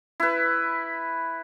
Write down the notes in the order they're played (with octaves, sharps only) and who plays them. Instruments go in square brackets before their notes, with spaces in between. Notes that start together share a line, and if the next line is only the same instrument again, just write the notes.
[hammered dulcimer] E4 B4